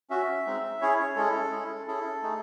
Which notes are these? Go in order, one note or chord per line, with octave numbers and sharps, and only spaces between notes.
C#4 F#4 E5
G#3 C4 D#4
C#4 E4 G#4 C#5
C#5
G#3 C#4 E4 G#4 A4
G#3 C#4 E4 G#4
C#4 E4 G#4 A4
A3 D#4 G#4